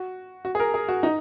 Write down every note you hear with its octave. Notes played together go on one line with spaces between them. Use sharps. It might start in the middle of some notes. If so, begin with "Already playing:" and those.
Already playing: F#4
F#4
G#4
A#4
G#4
F#4
D#4